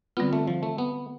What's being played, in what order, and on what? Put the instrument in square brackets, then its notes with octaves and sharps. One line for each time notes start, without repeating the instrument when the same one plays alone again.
[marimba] D3 G3 C4 F4 [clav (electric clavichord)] B3
[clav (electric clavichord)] A3
F3
A3
B3